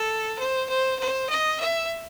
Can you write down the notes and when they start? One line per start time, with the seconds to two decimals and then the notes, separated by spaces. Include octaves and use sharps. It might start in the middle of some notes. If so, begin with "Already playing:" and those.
Already playing: A4
0.39 C5
0.69 C5
1.00 C5
1.29 D#5
1.60 E5